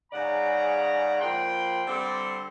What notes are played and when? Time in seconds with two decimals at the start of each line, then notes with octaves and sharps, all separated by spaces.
0.12 G#2 C#3 D5 F#5 A#5
1.20 A#2 F3 G5 B5 C6
1.88 D3 G3 C4 A4 D5 C6